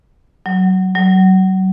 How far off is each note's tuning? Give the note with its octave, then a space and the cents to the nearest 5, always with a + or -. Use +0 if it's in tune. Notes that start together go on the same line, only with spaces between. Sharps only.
F#3 +15
F#3 +30